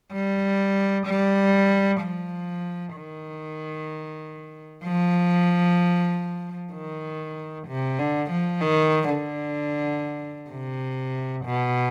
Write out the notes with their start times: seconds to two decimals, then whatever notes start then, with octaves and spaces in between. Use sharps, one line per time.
0.12 G3
1.06 G3
2.01 F3
2.96 D#3
4.84 F3
6.73 D#3
7.67 C3
7.99 D3
8.30 F3
8.61 D#3
9.09 D3
10.51 C3
11.45 B2